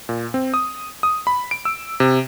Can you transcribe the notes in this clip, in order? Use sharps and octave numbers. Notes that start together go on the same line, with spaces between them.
A#2
C4
D#6
D#6
B5
D7
E6
C3